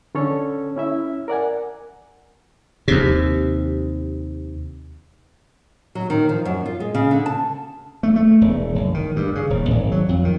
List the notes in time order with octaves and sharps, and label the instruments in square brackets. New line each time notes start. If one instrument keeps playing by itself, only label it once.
[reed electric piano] D3 C#4 A4 C#5
C#4 E4 E5
A#4 D5 F#5 G#5
[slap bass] D#2 C3
[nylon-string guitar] F#3
D#3
F3
F#2
F4
G#3
C#3
D3
A5
[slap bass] A3
A3
E1
F#1
D#3
G2
C#3
D#1
G#1
F#3
F2
D#3